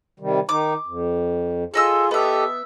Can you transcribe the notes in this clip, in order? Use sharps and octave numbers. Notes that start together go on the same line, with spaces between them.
C3 D#3 G3
D#3 D#4 D6
F2
F4 G#4 A4 D#5 E6
B3 G4 A4 D#5 E5